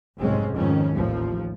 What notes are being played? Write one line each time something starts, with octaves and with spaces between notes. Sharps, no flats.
F1 B1 G#2 G#3 C4 C#4
F2 G#2 D#3 C#4
A1 D#2 F3